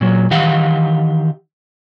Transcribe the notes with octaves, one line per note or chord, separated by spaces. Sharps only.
A#2 F#3
D#3 E3 G4 F5 F#5